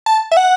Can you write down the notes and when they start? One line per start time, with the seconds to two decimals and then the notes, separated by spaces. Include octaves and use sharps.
0.06 A5
0.31 E5
0.37 F#5